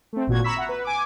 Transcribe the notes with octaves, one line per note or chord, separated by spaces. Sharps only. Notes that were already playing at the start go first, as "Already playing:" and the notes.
A3 C4
G#1 A#2 F#4 G#6
A#5 B5 C#6 E6 B6
E5 F#5 A#5
B4
G#5 D6